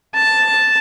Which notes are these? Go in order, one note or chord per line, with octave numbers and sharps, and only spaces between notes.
A5